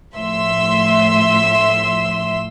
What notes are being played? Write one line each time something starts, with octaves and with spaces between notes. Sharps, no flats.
A2 F3 E5 C6 E6